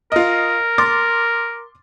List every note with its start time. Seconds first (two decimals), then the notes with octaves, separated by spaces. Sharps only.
0.12 F4 A#4 D#5
0.78 C6 D6 A6